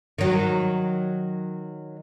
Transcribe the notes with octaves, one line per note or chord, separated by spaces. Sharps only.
D#3 F#3